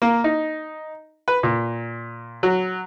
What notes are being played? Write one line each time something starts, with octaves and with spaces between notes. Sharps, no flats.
A#3
D#4
B4
A#2
F#3